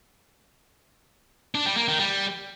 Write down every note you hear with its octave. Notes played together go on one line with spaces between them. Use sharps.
D4
G3
A#3
D#3
G3